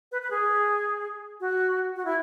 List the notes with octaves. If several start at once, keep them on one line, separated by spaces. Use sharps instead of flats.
B4
B4
G#4
F#4
F#4
E4